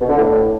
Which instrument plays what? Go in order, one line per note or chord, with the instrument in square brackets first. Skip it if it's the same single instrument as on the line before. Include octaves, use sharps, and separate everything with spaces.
[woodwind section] B2
D3
A2